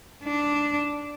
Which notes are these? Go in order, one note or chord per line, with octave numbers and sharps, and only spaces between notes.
D4